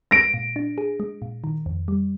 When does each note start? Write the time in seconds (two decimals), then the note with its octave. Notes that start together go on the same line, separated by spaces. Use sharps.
0.11 G#3 A#6 D7
0.34 A#2
0.56 D4
0.78 G#4
1.00 G#3
1.22 A#2
1.44 D#3
1.66 F2
1.88 G3